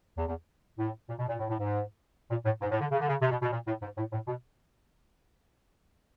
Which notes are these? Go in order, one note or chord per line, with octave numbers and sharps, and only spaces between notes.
E2
E2
A2
A#2
B2
A#2
A2
A2
G#2
A#2
A2
G#2
A2
D3
C#3
D3
C#3
C3
B2
B2
A#2
A2
G#2
A2
A2
B2